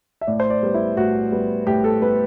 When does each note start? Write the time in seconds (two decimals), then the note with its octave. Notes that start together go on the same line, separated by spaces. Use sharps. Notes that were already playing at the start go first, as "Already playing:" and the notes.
0.21 E5
0.27 A2 D5
0.40 C5
0.50 D5
0.63 G3 B3
0.74 E4
0.97 A2 F#4
1.32 G3 B3
1.67 A2 G4
1.84 A4
2.02 G3 B3 B4